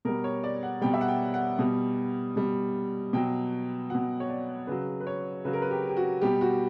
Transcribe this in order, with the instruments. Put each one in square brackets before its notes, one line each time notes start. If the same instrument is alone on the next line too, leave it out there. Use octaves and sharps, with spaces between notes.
[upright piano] B2 G3 A#4
C#5
D5
F#5
B2 G3 G5
E5
F#5
G5
F#5
B2 G3
B2 G3
B2 F#3 G5
B2 F#3 F#5
C#5
D5
C#3 F#3 B4
B4
C#5
C#3 F#3 B4
A#4
B4
G4
G4
F#4
B2 G3 G4
F#4